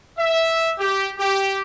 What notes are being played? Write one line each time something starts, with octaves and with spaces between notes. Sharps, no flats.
E5
G4
G4